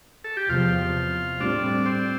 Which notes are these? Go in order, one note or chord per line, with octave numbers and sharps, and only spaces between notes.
A4
G4
E2 C3 F3 F4
A2 G3 C4 D4
C4